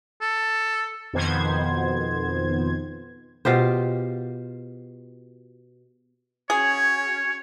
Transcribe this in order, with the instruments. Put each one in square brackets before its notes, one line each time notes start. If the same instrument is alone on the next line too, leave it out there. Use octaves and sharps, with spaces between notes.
[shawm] A4
[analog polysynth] F2 B2 D#3 B3 C5 G#6
[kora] B2 F4 G4 C5
[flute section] C#4 F#4 G#6 [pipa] G#4 [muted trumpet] C#5